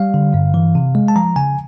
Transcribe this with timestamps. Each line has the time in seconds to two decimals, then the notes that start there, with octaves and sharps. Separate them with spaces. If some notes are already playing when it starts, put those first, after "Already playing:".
Already playing: G3 F5
0.14 D3
0.34 G2
0.54 E3
0.75 C3
0.95 G#3
1.08 A5
1.16 F3 A#5
1.36 C#3 G#5